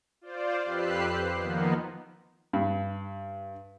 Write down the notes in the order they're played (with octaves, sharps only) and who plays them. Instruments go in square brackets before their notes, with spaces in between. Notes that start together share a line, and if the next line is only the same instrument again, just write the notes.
[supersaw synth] F4 C5 D5
F2 G4 B4 E6 F#6 C7
C5
D#3 F3 A#3 B3 D#4
[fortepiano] G2